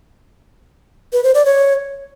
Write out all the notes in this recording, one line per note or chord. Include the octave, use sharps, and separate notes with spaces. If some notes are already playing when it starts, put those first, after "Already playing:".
B4
C5
D5
C#5